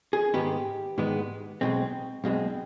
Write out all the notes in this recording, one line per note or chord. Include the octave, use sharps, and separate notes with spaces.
G#4
G#2 D#3 G#3 B3 G4
G#2 D#3 G#3 B3
B1 B2 G#3 C4
B1 B2 G#3 C4